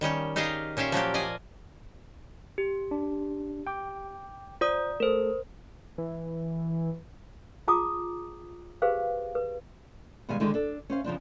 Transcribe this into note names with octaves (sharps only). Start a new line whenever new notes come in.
D#3 G3 C#4 G5
D#4 G4 G#4 D#5 F5
A#2 C#4 G4 E5 F5
F3 F#3 A#3 G4
D5 D#5 F5 G#5
G4
D4
G5 D6
F4 C5 D5 D#6
A3 A4 A#4 C5
E3
F4 G#4 A5 A#5 D6 D#6
G4 G#4 B4 C5 F5
B4
B2 D#3 G3 G#3 F5 G#5
D3 D#3 G#3 D4 F#4 G#4
D4 A4
C#4 C5 F5
C#3 F3 C4 D4